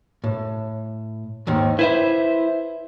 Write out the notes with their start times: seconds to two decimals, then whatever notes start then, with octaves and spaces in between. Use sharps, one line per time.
0.24 A2
1.47 D#2 G#2 D#3
1.79 E4 B4 C5 E5